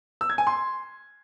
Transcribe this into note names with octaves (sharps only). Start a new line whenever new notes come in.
E6
G#6
G#5
C6